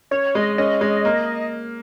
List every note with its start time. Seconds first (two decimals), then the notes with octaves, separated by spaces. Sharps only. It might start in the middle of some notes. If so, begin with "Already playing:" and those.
0.11 C#4 C#5
0.35 G#3 D#5
0.58 C#4 D#5
0.81 G#3
1.05 A#3